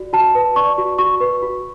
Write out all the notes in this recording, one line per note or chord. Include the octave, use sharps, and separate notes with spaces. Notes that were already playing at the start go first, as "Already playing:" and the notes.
Already playing: F#4 D5
F#4 A5
B4
D5 C#6
F#4
F#4 C#6
B4
F#4